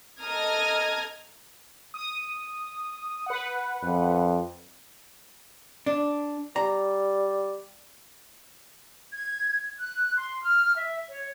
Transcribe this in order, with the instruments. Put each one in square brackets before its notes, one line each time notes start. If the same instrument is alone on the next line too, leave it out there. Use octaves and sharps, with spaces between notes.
[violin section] A4 D#5 A#5 D#6 F6 G#6
[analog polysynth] D#6
B4 F#5
[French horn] F2
[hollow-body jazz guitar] D4
[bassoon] G3 [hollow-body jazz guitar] A#5
[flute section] G#6
F#6
C6
F6
E5
C#5